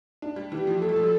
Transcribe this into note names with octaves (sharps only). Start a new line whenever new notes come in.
D4
G3
E3 G4
F3
A3 A4
G3
F3
G3